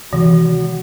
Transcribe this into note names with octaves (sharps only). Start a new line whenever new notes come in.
C3 D#3 E3 G#3 F#4